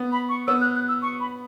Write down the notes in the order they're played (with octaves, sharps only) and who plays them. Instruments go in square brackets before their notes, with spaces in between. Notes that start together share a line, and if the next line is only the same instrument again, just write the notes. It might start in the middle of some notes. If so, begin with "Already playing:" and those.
Already playing: [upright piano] B3
[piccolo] B5
C#6
[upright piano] B3 [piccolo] E6
[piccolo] F#6
F#6
E6
C#6
B5